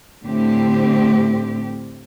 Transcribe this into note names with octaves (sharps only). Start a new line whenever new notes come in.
A2 D3 A3 C4 G4